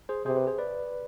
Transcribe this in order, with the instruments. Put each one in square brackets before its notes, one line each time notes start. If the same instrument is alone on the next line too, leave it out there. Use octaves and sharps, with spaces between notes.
[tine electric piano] G#4 C5
[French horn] C3 [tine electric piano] G#4 C5
[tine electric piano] G4 B4
G#4 C5
B4 D5